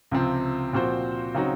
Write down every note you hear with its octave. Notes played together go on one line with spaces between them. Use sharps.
C#2 C3 F3 C4
A#2 F3 C4 F#4 C5
C#3 F#3 C4 D#4 F#4